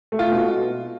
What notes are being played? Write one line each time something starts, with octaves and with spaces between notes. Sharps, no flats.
A3
F4
B2